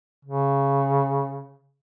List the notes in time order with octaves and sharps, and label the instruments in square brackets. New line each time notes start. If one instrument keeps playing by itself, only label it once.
[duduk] C#3